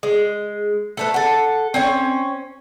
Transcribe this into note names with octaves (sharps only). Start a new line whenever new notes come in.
G#3
A3 A4 B4
A4 F#5
C4 C#4 C#5